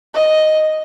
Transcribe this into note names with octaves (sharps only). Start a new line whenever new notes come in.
D#5